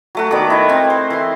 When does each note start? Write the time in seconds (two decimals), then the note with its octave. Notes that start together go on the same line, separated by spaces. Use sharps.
0.15 F#3 A3 F#4
0.31 D#3 B3 D5 D6
0.50 E4 D#5
0.68 C4 A#4
0.90 C5
1.10 E3 C6